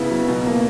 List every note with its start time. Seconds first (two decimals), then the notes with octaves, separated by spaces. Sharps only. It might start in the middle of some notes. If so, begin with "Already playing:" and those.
Already playing: C#3 B3 E4
0.10 F#3
0.28 B2
0.46 A#3